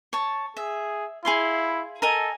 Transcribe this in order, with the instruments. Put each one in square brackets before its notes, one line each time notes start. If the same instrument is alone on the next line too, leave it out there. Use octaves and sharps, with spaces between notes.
[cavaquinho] C#5 A5
[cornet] G#4 [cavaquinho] E5
[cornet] E4 [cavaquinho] G#4 F5 C6
[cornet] A4 [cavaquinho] A#4 D#5 G#5